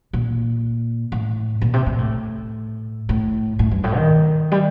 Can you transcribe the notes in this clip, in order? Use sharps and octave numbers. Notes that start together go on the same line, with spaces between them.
A#2
A2
A#2
C3
A#2
A2
A2
A2
G2
A2
D#3
G3